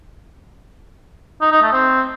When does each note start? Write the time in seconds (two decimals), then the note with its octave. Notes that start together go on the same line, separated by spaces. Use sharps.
1.41 D#4
1.52 D#4
1.62 A3
1.73 C4